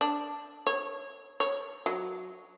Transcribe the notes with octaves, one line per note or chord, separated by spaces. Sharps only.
D4
C#5
C#5
F#3